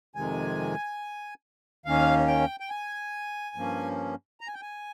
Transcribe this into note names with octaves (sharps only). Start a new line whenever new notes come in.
F2 C3 D#3 G#3 G#5
D#2 D#3 A#3 C#4 F5
G5
G5
G#5
G2 F3 A#3 C#4
A#5
G#5
G5
G#5